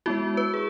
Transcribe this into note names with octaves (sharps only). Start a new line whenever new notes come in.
G#3 B3 E4 F#4
B4
G#4